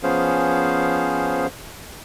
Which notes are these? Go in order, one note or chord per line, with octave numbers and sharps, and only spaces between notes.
F3 B3 C#4 G#4 C5 F5